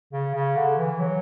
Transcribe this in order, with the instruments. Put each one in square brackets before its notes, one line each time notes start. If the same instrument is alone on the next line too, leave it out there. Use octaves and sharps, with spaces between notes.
[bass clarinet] C#3
C#3
D3
E3
F#3